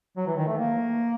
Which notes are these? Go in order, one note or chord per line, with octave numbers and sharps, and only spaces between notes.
F#3
E3
D#3
A3
A#3